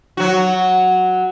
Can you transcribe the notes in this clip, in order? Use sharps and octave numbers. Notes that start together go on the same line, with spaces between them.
F#3 F#4